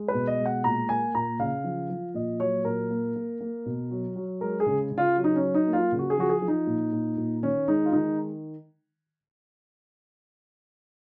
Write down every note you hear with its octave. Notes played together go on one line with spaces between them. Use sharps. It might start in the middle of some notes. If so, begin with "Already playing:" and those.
Already playing: G#3
B4
B2
D#5
G#3
F#5
A#2 A#5
A#3 G#5
A#2 A#5
C#3 F5
F3
F3
A#2 D#5
F#3 C#5
A#2 A#4
A#3
A#3
A#3
B2
F#3
F#3
G#3 A#4
G#4
C#3
C#3
F4
F#3
D#4
C#4
F#3
D#4
A#3
F4
C#3
F#4
G#4
F3 F#4
G#4
F3
D#4
A#2
A#2
A#2
D#3 C#4
G#3 D#4
F4
D#3 D#4